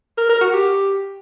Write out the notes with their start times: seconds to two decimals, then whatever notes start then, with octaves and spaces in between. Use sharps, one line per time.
0.17 A#4
0.29 A#4
0.41 F#4
0.53 G4